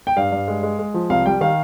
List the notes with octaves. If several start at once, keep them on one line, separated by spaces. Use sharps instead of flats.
G5
G2 F5
G2
G#3
G#3
G#3
F3
C2 F5
G3 G5
D#3 F5